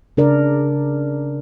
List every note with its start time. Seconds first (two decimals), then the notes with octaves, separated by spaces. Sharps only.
0.17 C#3 D4 A#4 D5